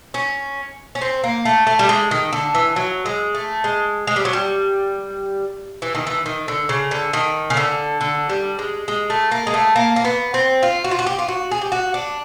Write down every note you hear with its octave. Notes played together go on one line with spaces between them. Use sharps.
C#4
C#4
C4
A#3
A3
A3
G3
G#3
D#3
D3
E3
F#3
G#3
A3
G#3
G#3
G3
F#3
G3
E3
D#3
E3
D#3
D3
C#3
D3
D#3
C#3
D3
D3
G3
G#3
G#3
A3
A#3
G#3
A3
A#3
A#3
B3
C4
F4
F#4
F4
F#4
G4
F4
F#4
G#4
G4
F#4
D4